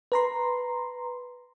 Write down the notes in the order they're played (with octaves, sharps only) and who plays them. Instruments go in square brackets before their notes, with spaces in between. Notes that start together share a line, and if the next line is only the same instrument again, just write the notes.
[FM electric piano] B4 A#5 C6